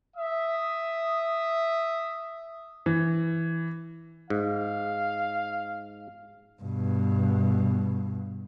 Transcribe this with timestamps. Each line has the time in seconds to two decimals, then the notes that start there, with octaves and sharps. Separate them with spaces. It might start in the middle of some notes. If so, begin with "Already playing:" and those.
0.17 E5 D#6
2.86 E3
4.30 G#2 F5
6.62 G2 B2